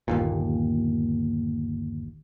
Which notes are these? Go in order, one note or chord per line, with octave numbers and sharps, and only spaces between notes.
G1 D#2 A#2